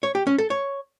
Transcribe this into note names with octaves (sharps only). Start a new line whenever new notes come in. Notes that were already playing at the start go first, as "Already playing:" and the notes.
C#5
G4
C#4
A4
C#5